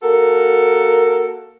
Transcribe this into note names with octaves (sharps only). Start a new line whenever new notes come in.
A#3 F#4 A4 A#4